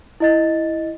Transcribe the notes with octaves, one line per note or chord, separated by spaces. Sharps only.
E4 D#5 A6